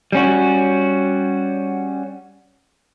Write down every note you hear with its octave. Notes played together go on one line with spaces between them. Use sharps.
G3 C#4 F#4